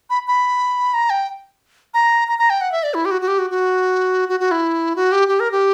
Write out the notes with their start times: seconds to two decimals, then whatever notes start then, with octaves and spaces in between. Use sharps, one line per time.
0.10 B5
0.28 B5
0.94 A#5
1.10 G5
1.94 A#5
2.28 A#5
2.39 A#5
2.50 G5
2.61 F#5
2.72 E5
2.83 D5
2.94 E4
3.05 G4
3.11 F#4
3.21 F#4
3.28 G4
3.39 F#4
3.50 F#4
4.29 F#4
4.40 F#4
4.51 E4
4.96 F#4
5.12 G4
5.28 G4
5.40 A#4
5.52 G4